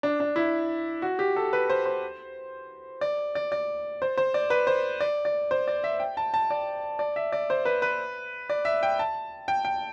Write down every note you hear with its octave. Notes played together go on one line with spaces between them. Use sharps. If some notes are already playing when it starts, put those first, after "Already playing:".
D4
D4
E4
F#4
G4
A4
B4
C5
C5
D5
D5
D5
C5
C5
D5
B4
C5
D5
D5
C5
D5
E5
G5
A5
A5
D5
D5
E5
D5
C5
B4
B4
D5
E5
G5
A5
G5
G5